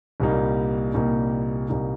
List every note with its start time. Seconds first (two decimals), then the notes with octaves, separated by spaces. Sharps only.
0.20 C2 A#2 G3 A#3 D#4
0.94 C2 A#2 G3 A#3 D#4
1.69 C2 A#2 G3 A#3 D#4